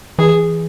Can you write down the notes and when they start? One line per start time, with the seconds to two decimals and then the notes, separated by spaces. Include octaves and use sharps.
0.18 E3 G#4